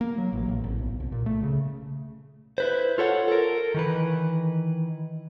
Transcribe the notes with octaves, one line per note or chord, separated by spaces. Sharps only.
A#3
F#3
A1
A1
G#1
B1
C2
A#2
A3
C#3
E4 B4 C5
F4 A4 C#5 F#5
A4 A#4
D#3 E3 B4